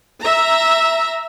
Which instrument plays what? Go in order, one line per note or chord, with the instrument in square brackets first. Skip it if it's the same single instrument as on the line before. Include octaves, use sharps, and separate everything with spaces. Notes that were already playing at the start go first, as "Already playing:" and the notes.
[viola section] E5 A#5